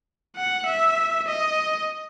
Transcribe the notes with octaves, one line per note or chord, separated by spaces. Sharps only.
F#5
E5
D#5